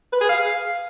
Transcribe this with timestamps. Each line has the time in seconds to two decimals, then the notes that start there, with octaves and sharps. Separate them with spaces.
0.13 B4
0.21 G#4
0.29 F5